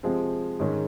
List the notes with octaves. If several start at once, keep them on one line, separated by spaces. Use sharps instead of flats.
C3 F3 G#3 C4
G#2 D#3 G#3 C#4